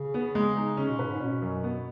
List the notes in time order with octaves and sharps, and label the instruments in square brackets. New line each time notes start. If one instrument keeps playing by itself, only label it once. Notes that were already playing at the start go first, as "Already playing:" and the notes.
Already playing: [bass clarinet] C#3
[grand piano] B3
G#3
D#4
[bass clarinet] C#3 [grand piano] C#4
[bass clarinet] B2
[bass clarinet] G#2 [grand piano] B4
[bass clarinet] G#2
[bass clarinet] B2 [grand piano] C#4
[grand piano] F#2
B3